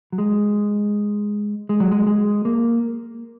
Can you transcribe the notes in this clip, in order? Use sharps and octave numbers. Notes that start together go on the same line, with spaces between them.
F#3
G#3
G#3
F#3
G#3
G#3
A#3